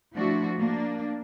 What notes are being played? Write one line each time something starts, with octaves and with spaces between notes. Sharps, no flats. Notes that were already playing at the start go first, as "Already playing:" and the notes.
F3 A3 D4 E4 F#4
A#3 D4